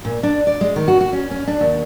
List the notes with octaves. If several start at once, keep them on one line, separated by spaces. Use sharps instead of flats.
A#2
D4
D5
G#3
D#3
F#4
F#4
C#4
C#4
D4
D#2